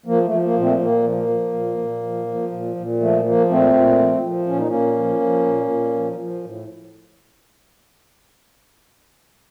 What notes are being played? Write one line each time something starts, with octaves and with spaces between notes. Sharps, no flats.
F3 A#3
A3
F3
A#3
A#2
A3 C4
A#2 A#3
F3
A#3
F3
A#2
A#2
F3
F3
A#2
A#2
F3 A3
F3 A#3
A#2 A3 C4
A#2
F3
F3
A#2 C#4
D#4
A#2 A#3 C#4
F3
F3
A#2
A#2
F3
F3
A2